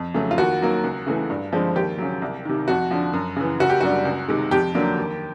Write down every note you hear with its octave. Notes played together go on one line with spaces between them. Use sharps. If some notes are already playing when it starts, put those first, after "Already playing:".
Already playing: F2
C#3 F#3 A3
F4
D#2 F#4
D#3 F#3 A#3
C#2
C#3 E3 A3
G2
D3 F3 G#3 C4
D#2 G4
C#3 F#3
C2
C3 D#3
F2 F#4
D3 F3
F#2
C#3 E3
F#1 F#4
G4
F#2 D3 G3 F#4
C#2
C3 D#3 G#3
F2 G4
D3 F#3 A#3
D#2